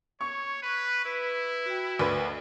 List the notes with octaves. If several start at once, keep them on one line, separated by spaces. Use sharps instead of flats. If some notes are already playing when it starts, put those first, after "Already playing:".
C#5 C#6
B4
E4 B4
F#4 G5
D2 B4 D5 D#5